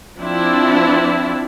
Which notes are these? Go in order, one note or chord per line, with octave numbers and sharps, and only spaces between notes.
F3 C4 D4 E4